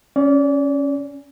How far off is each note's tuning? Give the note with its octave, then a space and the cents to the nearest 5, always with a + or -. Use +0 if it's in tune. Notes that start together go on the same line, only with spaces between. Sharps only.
C#4 +0 D5 -30